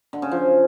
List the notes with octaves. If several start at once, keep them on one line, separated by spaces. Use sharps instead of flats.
D3
C#3
F3